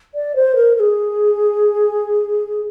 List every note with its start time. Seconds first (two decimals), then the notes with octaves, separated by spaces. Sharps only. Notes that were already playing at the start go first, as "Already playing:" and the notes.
0.15 D5
0.35 C5
0.56 A#4
0.75 A#4
0.80 G#4